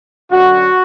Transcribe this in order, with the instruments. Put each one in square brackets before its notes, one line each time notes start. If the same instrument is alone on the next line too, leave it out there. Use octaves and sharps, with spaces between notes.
[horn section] F#2 D3 F#3 F#4